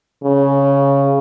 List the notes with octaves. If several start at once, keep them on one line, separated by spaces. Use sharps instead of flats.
C#3